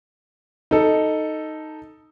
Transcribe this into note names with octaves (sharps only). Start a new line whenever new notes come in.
D#4 A4